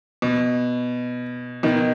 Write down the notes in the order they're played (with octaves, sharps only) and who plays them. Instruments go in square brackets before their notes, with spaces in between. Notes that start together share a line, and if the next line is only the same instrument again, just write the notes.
[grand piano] B2
B2 D#3